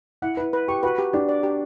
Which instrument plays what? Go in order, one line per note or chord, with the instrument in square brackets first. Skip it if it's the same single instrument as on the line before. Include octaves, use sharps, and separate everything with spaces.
[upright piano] E4 [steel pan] F#5
[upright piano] E4 [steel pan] B4
[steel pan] B4
[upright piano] G4 [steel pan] C#6
[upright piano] F#4 [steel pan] B4
[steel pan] G4
[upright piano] D4 [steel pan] G4
[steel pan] D5
G4